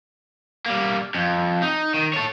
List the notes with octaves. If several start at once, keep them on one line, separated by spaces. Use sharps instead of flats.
G3 A#3
F2
D#4
D#3
A4 C#5